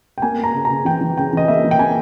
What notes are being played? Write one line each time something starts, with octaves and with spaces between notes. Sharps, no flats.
G5
A#3 G#5
A#3
A#5
C#3
A#5
C#3
E3 G5
E3
C#3 G5
E3 D#5
A#3 E5
E3
G5
A#3 G#5